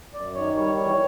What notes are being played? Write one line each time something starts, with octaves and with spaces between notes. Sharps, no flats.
F#2 D5
D#3 C#5
G3 C#5
E2 C#5